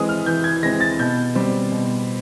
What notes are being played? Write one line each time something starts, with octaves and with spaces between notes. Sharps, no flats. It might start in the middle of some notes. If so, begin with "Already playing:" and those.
Already playing: E3 G#3 C4 D#6
F6
E3 G6
G#6
G#3 C4 A#6
A6
B2 G6
G3 C4
B2